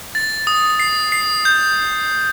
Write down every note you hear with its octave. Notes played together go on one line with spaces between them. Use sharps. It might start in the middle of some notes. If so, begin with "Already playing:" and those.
A6
D#6
C7
C7
G6